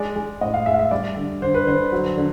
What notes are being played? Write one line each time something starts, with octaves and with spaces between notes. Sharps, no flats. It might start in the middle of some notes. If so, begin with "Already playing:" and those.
Already playing: G#3 D5
G#3
A2 D#5
F5
G#3 E5
F5
E5
G3 D5
D3
D3 C5
B4
D3 C5
F#3
D3